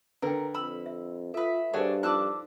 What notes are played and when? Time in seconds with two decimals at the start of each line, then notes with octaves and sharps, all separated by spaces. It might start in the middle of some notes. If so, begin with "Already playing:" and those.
0.22 D3 A#4 B4 G5
0.54 F2 B5 E6
0.86 E5
1.34 F4 A4 B4 E5 D#6
1.73 G2 D4 F#4 G#4 A4 C5 C#5
2.03 F3 D4 D#4 A5 C6 D6 E6 F#6